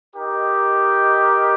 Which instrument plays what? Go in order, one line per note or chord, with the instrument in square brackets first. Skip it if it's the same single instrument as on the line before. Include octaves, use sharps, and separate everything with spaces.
[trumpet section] D#4 G4 A#4 D#5